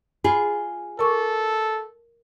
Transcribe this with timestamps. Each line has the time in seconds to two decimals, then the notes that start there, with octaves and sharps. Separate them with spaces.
0.24 F4 G#4 B5
0.99 A4 A#4 C#6 D6